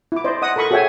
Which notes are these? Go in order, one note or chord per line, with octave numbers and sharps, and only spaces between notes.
E4 D6
C5 D5 D#5
D#5 F#5 D#6
A4 A#4 B5 C#6 D#6
F#4 G#4 C#5 E5 G5 G#5